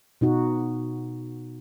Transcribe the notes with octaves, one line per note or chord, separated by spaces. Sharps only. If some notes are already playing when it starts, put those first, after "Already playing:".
B2 D#4 F#4